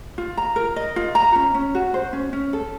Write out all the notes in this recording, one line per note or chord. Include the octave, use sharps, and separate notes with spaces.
F4
A#5
A#4
D#5
F4
A#5
C#4
C#4
F#4
C5
C#4
C#4
A4